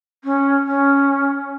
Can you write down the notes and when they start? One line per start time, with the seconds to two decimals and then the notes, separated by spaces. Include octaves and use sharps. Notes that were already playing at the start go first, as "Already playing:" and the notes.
0.24 C#4
0.66 C#4